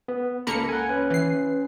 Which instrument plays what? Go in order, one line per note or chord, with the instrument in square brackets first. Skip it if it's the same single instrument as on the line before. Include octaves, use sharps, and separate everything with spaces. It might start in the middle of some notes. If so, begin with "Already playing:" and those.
[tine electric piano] B3
[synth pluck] C#2 A#3 C#7 [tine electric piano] A4 A#5 B5
[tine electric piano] F#5 G#5
C#4 B4
[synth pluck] E3 C7